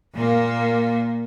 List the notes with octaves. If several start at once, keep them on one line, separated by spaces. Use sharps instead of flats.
A#2 A#3